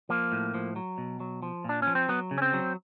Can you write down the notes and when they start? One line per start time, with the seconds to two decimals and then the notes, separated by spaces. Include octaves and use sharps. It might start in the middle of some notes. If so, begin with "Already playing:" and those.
0.09 F3 A#3
0.32 A2
0.54 F3
0.76 F#3
0.98 B2
1.20 F#3
1.42 F3
1.64 A#2 D4
1.82 F3 C#4
1.95 C4
2.09 F#3 B3
2.31 C#3
2.38 C#4
2.42 C4
2.53 F#3